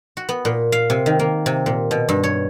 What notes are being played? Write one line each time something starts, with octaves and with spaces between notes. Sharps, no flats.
F#4
B3
A#2
F5
C3
D#3
A#3
C3
A#2
B2
G2
C#5